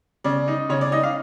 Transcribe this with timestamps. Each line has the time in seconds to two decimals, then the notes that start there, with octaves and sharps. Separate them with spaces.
0.24 C#3 D5
0.48 D#4
0.69 C#3 C#5
0.81 D5
0.92 D#4 D#5
1.03 F5